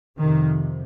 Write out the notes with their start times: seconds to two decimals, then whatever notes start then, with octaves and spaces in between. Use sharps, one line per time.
0.17 F2 C3 D#3